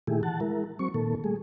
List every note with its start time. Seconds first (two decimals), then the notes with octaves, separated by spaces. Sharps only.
0.07 A#2 D#3 A3 E4 G4 G#4
0.23 E3 F#5 A5
0.40 G#3 E4 A#4
0.79 F#3 C4 C#6
0.94 A#2 D#3 A#3 A4
1.24 G3 A3 G#4